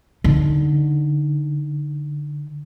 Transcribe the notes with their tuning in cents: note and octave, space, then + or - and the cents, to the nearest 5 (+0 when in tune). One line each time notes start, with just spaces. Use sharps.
D3 +0 D#4 +0